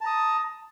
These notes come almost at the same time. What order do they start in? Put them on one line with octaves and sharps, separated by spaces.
A5 A#5 D#6